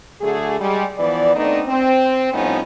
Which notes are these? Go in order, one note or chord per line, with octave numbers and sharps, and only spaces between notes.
D3 F#3 A3 G#4
G3 G#3
E3 F3 B3 D5
A3 B3 C4 D4 D#4
C4
A2 F3 G3 B3 C#4 D#4